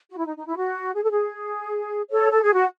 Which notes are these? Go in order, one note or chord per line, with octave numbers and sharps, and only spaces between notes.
F#4
E4
D#4
D#4
E4
F#4
G#4
A4
G#4
A4 C#5
A4
G#4
F#4